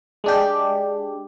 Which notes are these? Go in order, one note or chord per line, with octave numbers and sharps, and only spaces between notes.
G#3 D4 G4